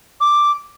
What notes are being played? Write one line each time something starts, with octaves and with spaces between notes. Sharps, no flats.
D6